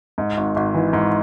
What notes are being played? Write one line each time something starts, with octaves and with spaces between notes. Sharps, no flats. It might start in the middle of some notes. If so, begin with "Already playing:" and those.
G#2
G#1
G#1
E3
G#2